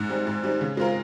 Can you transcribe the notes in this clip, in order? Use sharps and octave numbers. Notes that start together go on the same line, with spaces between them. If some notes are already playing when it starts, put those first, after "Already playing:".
Already playing: G#2
G3 C4 D#4
G#2
G3 C4 D#4
C#3
G#3 C4 F4 A#4